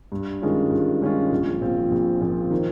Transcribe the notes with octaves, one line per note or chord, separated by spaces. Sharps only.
G2
D#3 G#3 C#4 F4
G2
D#3 G#3 C#4 F4
A#1
A#2 F3 C4 F4
A#1
A#2 F3 C4 F4
D#3